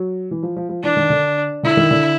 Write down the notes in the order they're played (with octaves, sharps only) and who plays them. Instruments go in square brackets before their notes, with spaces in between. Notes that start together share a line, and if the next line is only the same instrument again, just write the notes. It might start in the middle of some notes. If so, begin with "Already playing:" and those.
Already playing: [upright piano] F#3
E3
F3
F3
F3
[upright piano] E3 [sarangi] D4
[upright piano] D#3
D3
[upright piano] D3 [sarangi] E4
[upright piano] D#3
D3